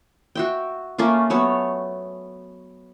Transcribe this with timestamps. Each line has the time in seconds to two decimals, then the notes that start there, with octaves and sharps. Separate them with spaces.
0.35 F#4 E5 G5
0.98 A3 A#3 C#4 F4
1.30 F#3 A3 B3 C#5